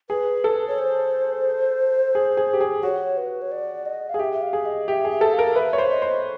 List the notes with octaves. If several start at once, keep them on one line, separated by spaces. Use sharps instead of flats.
G#4 B4
A4
C#5
C5
G#4
G#4
G4
G#4
F#4 C#5
B4
C#5
D5
D#5
G#4 F5
G4 E5
E5
F5
G#4
D#5
G4 E5
G#4
E5
A4
F5
A#4
B4 E5
C#5
C5
D#5
C5